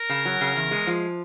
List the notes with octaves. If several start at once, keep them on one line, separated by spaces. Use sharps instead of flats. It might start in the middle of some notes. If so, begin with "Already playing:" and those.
Already playing: A#4
C#3
F#3
C#3
E2
G#3
F3